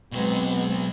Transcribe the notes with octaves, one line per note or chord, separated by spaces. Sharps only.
B2 F#3 G#3 B3 C4